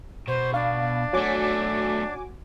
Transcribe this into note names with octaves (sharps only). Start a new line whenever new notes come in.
B2 C5
D4 F5
B1 A3 F#4 C#5 G#5 D6